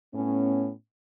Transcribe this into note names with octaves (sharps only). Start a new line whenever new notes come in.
A2 B3 C#4